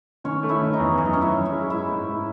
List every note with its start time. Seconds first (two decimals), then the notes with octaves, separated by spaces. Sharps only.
0.24 D#3 C#4 C#5
0.43 A3
0.49 E4 E5
0.61 D#3
0.73 D#4 D#5
0.79 E2
0.97 F#2 C#5
1.05 D#5
1.13 E3 C#4 C#5
1.21 E4 E5
1.34 F#2
1.45 E4 E5
1.52 G#3
1.70 G#2 E4 E5
1.89 G#2
2.07 G#2